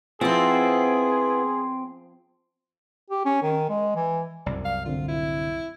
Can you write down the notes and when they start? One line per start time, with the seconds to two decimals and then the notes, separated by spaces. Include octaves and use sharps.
0.21 F3 B3 C4 E4 G#4
3.10 G4
3.25 C#4
3.43 D#3
3.69 G#3
3.96 E3
4.46 C2 F#2 D5
4.65 F5
4.85 A2 D3 C4 F4
5.08 E4